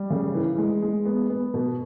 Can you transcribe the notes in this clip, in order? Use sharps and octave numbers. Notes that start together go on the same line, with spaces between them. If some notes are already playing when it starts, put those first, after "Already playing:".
Already playing: G3
C#3
E3
G#3
G#3
B3
B3
B2